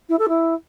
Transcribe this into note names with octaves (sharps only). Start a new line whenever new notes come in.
E4
A4
E4